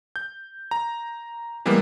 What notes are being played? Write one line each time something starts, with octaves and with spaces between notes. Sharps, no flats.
G6
A#5
E3 G3 G#3 A#3 B3